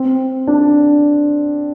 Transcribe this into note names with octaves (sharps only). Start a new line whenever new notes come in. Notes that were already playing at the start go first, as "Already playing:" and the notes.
Already playing: C4
D4